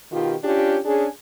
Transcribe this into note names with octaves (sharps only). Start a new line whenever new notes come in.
B2 D#3 F4 G4
C#4 D4 F4 G4
C#4 D4 G#4